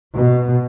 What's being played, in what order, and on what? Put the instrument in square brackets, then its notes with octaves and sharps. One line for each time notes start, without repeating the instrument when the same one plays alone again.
[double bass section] B2